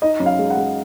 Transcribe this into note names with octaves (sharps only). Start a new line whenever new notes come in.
D#4 D#5
F#2
F5
G#3
F#5
G#3